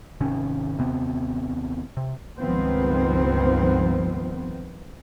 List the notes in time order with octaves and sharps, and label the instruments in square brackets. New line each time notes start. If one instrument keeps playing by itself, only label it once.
[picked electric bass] G#1 C3 D#3 C#4
D#2 C3 B3 C4
C3
[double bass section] C#2 G2 D#3 F3 B3 C4